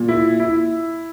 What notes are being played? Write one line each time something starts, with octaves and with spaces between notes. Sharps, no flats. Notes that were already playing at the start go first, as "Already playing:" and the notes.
Already playing: A#2
E4
E4